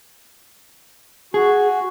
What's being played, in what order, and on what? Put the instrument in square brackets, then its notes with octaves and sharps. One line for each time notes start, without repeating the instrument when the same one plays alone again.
[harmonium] F#4 [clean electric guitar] G#4